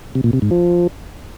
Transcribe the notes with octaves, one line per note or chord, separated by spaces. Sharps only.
C3
A#2
C3
G#2
F3